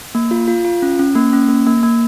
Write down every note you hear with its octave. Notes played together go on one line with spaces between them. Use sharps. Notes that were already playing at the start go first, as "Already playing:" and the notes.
A#3
F4
F4
F4
C#4
C#4
A#3
C#4
A#3
A#3
A#3